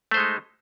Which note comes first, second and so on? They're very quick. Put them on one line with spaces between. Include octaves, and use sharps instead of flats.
A3 C5 G#3 D#4